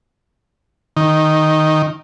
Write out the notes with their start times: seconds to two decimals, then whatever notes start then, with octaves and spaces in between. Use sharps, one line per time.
0.97 D#3